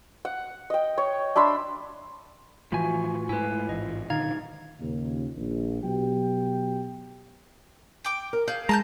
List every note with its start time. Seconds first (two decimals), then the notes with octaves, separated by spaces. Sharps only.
0.25 F#5
0.70 D#5 G5
0.98 C#5
1.36 D4 E5 B5 C6
2.72 A2 E3 F3 F4 F#4 G#5
3.29 G#2 A3 E4 F4 B4 G#5
3.69 A1 G#2 D#5
4.10 A#2 D3 D#3 D#4 F5 G#6
4.80 D#2 A#2 C#3
5.37 A#1
5.82 B2 F#3 G4 G5
8.04 G5 D6
8.33 A#4
8.48 G#4 F5 G6
8.69 G#3 A5 A#5 D#6 G6